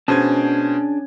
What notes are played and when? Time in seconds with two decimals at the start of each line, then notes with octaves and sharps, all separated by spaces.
0.08 B2 C#4 D4 G#4 C5 A5 G#6